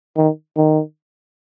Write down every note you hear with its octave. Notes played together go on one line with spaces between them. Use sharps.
D#3
D#3